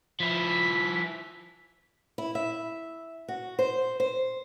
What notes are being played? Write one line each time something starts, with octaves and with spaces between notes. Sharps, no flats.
F3 E4 B6
E4
E5
F#4
C5
C5